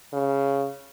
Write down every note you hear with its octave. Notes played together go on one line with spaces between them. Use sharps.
C#3